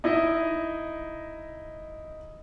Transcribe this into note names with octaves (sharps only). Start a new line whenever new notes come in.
D#4 E4 D#5